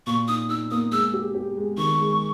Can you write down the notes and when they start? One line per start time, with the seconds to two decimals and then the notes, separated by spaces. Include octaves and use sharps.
0.07 A#2 C#6
0.28 D#4 D#6
0.49 D#4 E6
0.71 A#3 D#6
0.92 G#3 E6
1.13 G4
1.34 G4
1.57 G#3
1.78 D#3 C#6
1.99 G#3